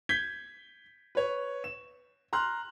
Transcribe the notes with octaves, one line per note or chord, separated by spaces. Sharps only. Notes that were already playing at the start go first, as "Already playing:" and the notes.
G6 G#6 B6 G7
B4 C#5
E7
A#5 C6 F6 F#6